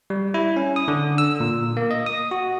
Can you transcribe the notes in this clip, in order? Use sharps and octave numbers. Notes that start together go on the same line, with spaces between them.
G3
E4
C#4
D#6
D3
E6
A#2
A#3
D#5
D#6
F#4